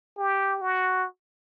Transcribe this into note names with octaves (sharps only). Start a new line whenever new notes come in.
G4
F#4